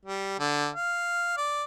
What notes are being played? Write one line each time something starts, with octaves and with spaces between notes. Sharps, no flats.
G3
D3
F5
D5